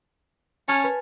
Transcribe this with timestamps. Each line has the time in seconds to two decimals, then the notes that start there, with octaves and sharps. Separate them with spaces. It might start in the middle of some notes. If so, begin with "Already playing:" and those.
0.68 C#4 G#5 A5 F6
0.84 B4